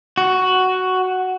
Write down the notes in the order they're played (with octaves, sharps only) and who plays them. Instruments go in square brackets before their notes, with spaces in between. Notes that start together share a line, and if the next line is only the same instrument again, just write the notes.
[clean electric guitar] F#4